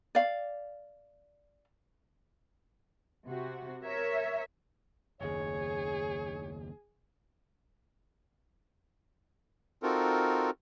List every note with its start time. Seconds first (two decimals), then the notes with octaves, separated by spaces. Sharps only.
0.15 D5 F5
3.26 C3 F#4
3.83 A#4 C#5 E5
5.21 F#1 D#2 G#4 C#5
9.83 C4 D#4 F4 F#4 A4 A#4